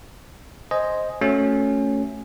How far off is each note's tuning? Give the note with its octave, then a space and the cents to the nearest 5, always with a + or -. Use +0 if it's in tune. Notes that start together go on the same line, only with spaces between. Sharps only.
C5 +0 D#5 +0 G#5 +0
A3 +0 C#4 +0 F#4 +0